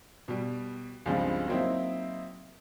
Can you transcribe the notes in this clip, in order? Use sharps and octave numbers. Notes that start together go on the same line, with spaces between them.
B2 G3
C#2 G2 F3 G3 G#3 C4
F#3 A#3 C4 D#4 E4